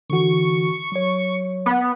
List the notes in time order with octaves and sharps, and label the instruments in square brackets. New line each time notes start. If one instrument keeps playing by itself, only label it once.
[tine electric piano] D3 E3 F#4 [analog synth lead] C#6
[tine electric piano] F#3 C#5
[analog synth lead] B3